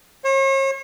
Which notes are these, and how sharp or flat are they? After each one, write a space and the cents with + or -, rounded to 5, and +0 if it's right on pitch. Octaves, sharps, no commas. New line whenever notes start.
C#5 -45